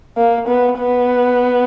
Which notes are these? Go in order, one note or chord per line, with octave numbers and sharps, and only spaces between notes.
A#3
B3
B3